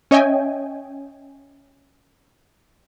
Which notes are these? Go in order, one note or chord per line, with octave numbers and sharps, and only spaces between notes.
C#4 C#5 D#5 E5 G5 G#5